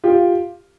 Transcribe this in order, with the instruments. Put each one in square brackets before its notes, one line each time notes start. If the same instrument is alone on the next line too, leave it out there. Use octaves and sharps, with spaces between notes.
[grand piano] F4 G4